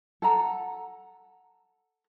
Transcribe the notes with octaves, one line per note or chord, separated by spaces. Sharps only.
A4 F#5 A#5